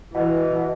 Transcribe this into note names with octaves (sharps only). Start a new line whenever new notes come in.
B2 E3